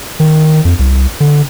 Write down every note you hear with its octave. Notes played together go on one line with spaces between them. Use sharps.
D#3
F2
C2
D3